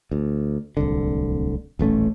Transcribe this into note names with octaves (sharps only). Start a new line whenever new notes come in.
D2
D1 C2 D3
D#1 A1 A3 C#4